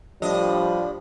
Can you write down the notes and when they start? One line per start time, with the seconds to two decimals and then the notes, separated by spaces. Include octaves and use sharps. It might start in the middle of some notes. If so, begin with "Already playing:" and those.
0.22 A2 F3 G3 D4 D#5